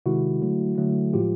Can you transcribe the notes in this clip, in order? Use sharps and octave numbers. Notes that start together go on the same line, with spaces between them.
C3 D#3 G#3 E4 F#4
D3 F#3 A3
D3 F#3 A3
A2 F3 G#3 F4 G4